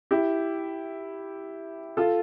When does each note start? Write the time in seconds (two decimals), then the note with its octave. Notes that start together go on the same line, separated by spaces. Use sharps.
0.11 E4 G4
1.97 F4 A4